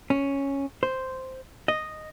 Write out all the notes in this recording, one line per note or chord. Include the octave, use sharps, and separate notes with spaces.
C#4
C5
D#5